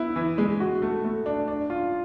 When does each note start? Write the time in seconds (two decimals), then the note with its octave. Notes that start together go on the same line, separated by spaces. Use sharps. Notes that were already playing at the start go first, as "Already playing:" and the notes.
Already playing: B3 E4
0.16 E3
0.38 G#3
0.60 F#4
0.82 A3
1.04 A3
1.26 D4
1.48 D4
1.70 F4